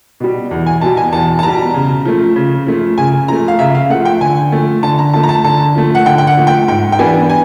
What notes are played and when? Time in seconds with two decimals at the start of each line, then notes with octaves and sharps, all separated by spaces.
0.20 B2 G3
0.51 E2
0.66 G#5
0.81 B2 G3 A5
0.97 G#5
1.13 E2 A5
1.39 A5
1.43 B2 G3 A#5
1.74 C#3
2.05 F3 A3
2.36 C#3
2.67 F3 A3
2.98 C#3 G#5
3.28 F3 A3 A#5
3.48 F5
3.59 C#3 E5
3.75 F5
3.90 A3 F#5
3.94 F3
4.05 G5
4.21 D3 G#5
4.52 F3 A3
4.83 D3 A5
4.98 A#5
5.13 F3 A3 A5
5.23 A#5
5.29 A5
5.44 D3 A5
5.75 F3 A3
5.95 F#5
6.06 D3 G5
6.18 G5
6.27 F#5
6.37 F3 A3
6.47 G5
6.68 G#2 G5
6.92 G5
6.99 E3 G3 B3 D4 G#5
7.29 G#5